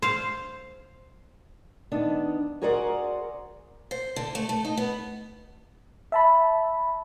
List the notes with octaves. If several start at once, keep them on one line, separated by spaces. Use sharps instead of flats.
C5 F5
D#3 B3 D4
F#4 G#4 A#4 C5 D5 F#5
C5
D3
A3
A3
D#4
B3
E5 A5 B5